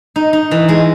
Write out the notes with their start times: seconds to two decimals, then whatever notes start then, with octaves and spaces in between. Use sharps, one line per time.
0.16 D#4
0.33 D#4
0.51 E3
0.69 G#3